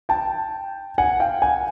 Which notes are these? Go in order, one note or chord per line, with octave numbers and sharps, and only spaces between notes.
G5 A5
F#5 G#5
F5 G5
F#5 G#5